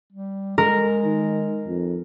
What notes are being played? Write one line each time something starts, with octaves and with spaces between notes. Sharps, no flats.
G3
G#3 A#4
D#3
F2